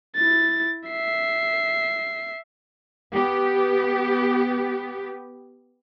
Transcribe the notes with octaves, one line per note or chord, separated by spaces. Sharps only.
E4 A6
E5 C7
B3 G4